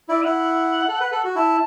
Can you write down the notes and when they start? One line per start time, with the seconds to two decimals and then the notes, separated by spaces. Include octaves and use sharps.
0.09 E4 D5
0.25 E4 F#5
0.88 A4
1.00 B4
1.12 A4
1.24 F#4
1.35 E4 A5